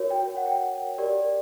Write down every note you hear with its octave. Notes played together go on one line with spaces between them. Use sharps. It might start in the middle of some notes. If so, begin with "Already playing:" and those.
Already playing: F#4 A#4 C#5
G5
F#5
G5
G4 A#4 D5